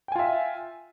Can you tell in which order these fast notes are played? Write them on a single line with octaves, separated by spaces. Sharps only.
G5 G#5 F4 E5